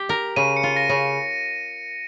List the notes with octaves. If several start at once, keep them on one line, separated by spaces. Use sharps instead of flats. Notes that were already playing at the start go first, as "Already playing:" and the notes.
Already playing: G4
A#4
C#3 D#7
C#7
F4
A#6
C#3